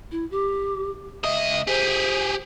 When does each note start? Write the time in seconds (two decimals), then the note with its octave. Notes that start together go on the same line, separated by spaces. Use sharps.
0.11 E4
0.31 G4
1.24 C#2 D#5 E5
1.67 G4 G#4 C5